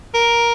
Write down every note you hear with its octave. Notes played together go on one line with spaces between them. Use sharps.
A#4